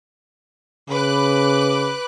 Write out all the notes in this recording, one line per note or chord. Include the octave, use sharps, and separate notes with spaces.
C#3 B4 D6 F#6